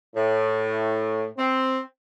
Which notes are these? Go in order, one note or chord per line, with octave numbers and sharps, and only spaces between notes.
A2
C4